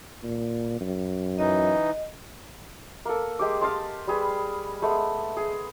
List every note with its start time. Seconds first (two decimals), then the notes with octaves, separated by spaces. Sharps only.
0.23 A#2
0.80 F#2
1.39 E3 D#4 D#5
3.05 A#3 A4
3.39 G#3 G4 D6
3.61 D#5 F5 A5 C6
4.07 G3 G#4 B4
4.82 G#3 A3 B3
5.37 G#4